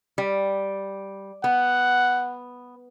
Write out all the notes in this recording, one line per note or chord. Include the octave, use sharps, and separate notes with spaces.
G3
B3 F#5